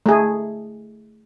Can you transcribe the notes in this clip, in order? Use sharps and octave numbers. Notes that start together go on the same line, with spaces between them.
A3 G#4